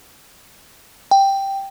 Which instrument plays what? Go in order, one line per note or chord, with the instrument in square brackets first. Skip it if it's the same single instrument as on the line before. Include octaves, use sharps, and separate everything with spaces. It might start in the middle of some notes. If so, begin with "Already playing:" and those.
[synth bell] G5